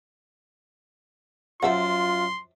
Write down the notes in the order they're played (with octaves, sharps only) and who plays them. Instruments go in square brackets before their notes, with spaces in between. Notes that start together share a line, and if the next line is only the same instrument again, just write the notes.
[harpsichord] F#2 [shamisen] F3 E5 F#5 [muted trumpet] F4 [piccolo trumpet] C6